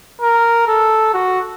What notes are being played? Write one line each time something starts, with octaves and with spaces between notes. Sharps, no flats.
A#4
A4
F#4